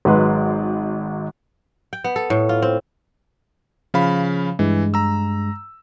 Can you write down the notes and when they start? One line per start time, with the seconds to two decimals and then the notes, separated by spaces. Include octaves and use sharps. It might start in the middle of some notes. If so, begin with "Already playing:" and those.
0.05 G#1 F#3 G#3 B4 C6
1.93 G5
2.04 B3
2.16 A4
2.30 A2
2.49 F4
2.62 C4
3.94 C#3 F3 F5 B5
4.59 G2 E3 G#3
4.94 A#5 E6